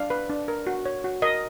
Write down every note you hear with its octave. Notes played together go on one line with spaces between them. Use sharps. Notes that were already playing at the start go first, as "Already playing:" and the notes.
Already playing: D4 F5
B4
D4
A#4
F#4
C#5
F#4
A#4 D#5